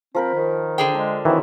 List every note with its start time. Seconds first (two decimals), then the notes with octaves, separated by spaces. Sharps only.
0.15 F3 C4 A#4 B5
0.34 D#3
0.78 D3 G#4 G5
0.95 G#3 D4
1.25 D#3 E3 F#3 C4 E4